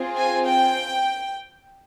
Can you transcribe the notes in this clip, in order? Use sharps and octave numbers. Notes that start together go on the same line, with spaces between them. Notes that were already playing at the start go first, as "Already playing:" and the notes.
Already playing: C4 F4 G#4
G#5
G5